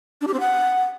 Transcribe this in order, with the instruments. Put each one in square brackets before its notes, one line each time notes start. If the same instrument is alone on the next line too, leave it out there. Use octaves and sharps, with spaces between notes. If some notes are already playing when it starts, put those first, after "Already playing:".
[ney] D4
G4
C4
F#5